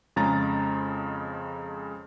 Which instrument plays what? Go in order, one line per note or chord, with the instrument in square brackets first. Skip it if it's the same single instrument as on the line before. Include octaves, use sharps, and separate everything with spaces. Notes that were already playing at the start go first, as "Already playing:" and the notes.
[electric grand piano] F2 C#3 G#3 A#5 A6